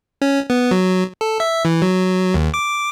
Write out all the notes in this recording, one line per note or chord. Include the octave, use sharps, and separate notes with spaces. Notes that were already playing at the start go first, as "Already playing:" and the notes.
C#4
B3
F#3
A4
E5
E3
F#3
D#2
D6